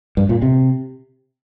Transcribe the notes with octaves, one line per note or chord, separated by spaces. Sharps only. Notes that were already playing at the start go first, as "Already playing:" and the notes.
G2
A#2
C3